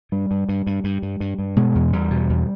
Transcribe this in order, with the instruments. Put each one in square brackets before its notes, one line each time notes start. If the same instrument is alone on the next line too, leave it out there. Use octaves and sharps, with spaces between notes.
[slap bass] G2 G3
G2
G2
G2
G2
G2
G2
G2
B2 G#3
E2
E2 G3
B2
E2